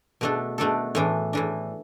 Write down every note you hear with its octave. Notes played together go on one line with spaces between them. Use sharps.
B2 A3 D4 A4
B2 A3 D4 A4
A2 E3 D4
A2 E3 D4